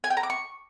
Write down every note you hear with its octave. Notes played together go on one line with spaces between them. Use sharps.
G#5
G5
A#5
D6
C#6